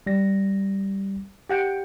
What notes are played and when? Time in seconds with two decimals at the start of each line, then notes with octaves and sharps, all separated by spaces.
0.07 G3 A#6
1.50 G4 F#5 G5